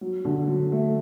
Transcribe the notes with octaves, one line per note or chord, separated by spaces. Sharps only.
F#3
D3
F#3
A3